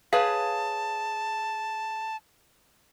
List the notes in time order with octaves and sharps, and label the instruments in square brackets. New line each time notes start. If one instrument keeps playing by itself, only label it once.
[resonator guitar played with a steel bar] G#4 B4 C#5 [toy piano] F5 [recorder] A5